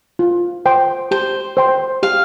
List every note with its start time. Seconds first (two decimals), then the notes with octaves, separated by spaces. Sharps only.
0.19 F4
0.66 C5 G5 C6
1.11 G4 C5
1.57 C5 G5 C6
2.03 G4 F5